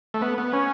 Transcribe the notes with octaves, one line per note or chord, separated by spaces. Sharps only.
A3
B3
B3
C#4